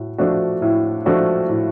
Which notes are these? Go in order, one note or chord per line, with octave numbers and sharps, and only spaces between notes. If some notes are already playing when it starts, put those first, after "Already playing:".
Already playing: A2 F#4
F3 A3 D4 F#4
A2
F3 A3 D4 F#4
A2